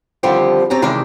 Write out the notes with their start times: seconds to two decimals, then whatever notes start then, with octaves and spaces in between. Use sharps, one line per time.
0.23 D3 D#3 F3 G3 C4 G4
0.70 C4 C#4 G4 A5 A#5
0.82 C3 D#3 E3 G#3 D4 G4